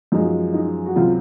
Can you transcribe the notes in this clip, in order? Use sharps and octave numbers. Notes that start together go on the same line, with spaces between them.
F#2 F3 G#3 D#4
D#4
F#4
C#2 C3 F#3 F4